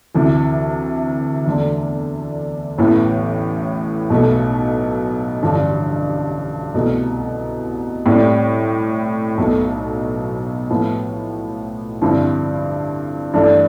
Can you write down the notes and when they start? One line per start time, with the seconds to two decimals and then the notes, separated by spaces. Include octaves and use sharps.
0.14 D2 C3 E3
1.46 E2 D3 A3 D4
2.78 A1 A2 E3 B3
4.10 B1 B2 A3
5.42 A1 G2 D3 F3
6.75 C2 B2 A3
8.06 A2 G3 C4 G4
9.38 B1 B2 A3
10.70 A2 F3 B3
12.02 G2 D3 F3 C4 E4
13.33 G2 E3 A3 D4